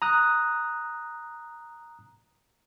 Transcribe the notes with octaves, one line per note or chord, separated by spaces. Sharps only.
A#5 D#6 F#6